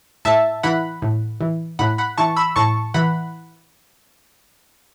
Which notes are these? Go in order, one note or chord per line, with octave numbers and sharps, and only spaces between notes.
A2 E5 A5
E3 F#5 B5
A2
E3
A2 F#5 B5
F#5 B5
E3 A5 C#6
B5 E6
A2 A5 C#6
E3 F#5 B5